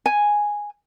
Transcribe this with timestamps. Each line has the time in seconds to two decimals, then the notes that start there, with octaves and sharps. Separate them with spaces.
0.06 G#5